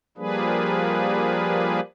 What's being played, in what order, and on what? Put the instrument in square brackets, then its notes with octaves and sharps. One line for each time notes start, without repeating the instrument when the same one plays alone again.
[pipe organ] F3 G3 A#3 D4 G#4 B4